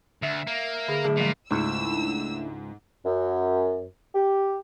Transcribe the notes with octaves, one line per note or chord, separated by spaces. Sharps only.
D2 E5
A#3
D3 G#4
A2 D3 F#3 G#4
A#2 F3 F#3 G#3
C#2 G#2 A3 D4 E4 E6
F#2
G4